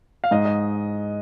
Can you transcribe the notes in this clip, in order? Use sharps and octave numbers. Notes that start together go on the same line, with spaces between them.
F5
G#2 D#5
D#5